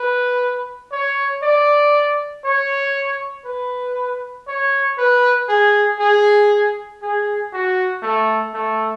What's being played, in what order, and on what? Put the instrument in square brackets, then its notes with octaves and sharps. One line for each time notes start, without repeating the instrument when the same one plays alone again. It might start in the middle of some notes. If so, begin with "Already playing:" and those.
Already playing: [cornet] B4
C#5
D5
C#5
B4
C#5
B4
G#4
G#4
G#4
F#4
A3
A3